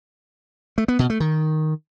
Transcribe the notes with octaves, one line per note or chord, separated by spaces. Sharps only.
A3
B3
B2
A3
D#3